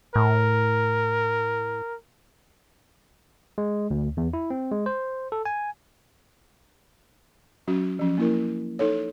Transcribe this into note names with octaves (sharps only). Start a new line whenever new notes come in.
A2 A#4
G#3
D2
E2
E4
C4
G#3
C5
A4
G#5
F#3 C#4 F#4
F3 C#4
A#3 E4 A#4
D#4 A4 C#5